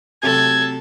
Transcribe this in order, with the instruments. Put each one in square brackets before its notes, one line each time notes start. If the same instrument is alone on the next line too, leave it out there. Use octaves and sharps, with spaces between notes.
[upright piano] C3 F#3 A3 [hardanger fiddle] A4 [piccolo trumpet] G#6